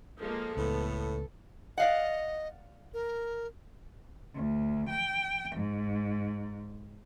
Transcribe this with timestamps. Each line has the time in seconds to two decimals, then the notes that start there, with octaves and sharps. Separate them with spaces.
0.20 F3 G#3 A#3 A4
0.57 C#2 A2 B3
1.78 D5 D#5 F5 F#5
2.94 A#4
4.35 D2
4.88 G5
5.55 G#2